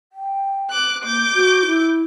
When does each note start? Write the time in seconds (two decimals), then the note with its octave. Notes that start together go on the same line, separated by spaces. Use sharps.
0.13 G5
0.71 D6 F#6
1.04 A#3 D6 G6
1.34 F#4
1.66 E4